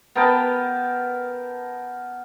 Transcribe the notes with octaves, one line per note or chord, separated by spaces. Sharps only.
B3 A#4 G5 A5